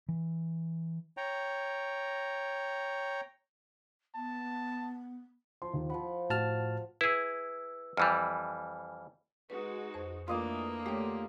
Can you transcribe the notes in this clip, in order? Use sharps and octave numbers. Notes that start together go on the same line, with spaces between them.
E3
C#5 G5 A#5
B3 A5
F3 C6
D#2
F3 F#5 B5
A2 F#4 A5 F6
E4 G#4 B4 E6
F2 E3 G3 G#5 F6
G#3 D#4 F#4 B4
F2 C5
E3 A3 A#3 D4 F4 D#5 D6
D3 A3 G4 C#5